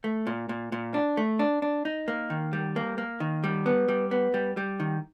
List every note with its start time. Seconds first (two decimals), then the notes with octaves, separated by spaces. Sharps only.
0.04 A3
0.27 A#2
0.49 A#2
0.72 A#2
0.94 D4
1.17 A3
1.39 D4
1.62 D4
1.85 D#4
2.08 A#3
2.30 D#3
2.53 G3
2.76 A#3
2.98 A#3
3.20 D#3
3.44 G3
3.66 B3
3.88 G3
4.11 B3
4.34 G3
4.57 G3
4.80 D#3